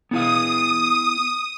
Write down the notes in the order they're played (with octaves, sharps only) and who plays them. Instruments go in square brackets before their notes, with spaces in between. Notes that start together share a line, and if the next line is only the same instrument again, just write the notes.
[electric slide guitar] B3 E4 F5 [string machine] D#6